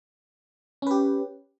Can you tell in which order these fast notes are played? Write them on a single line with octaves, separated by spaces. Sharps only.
C#4 B4 G4